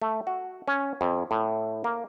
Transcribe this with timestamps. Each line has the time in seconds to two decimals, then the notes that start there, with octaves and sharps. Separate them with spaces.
0.02 A3
0.27 F#4
0.68 C#4
1.01 F2
1.31 A2
1.84 A#3